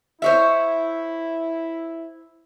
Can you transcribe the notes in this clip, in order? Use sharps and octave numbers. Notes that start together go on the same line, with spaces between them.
E4 C5 C#5 E5